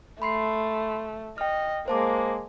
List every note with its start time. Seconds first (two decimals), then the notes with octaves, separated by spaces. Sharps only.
0.22 A3 B5 C6 C7
1.38 D#5 G5 F6
1.88 G#3 A#3 C5 A5 D6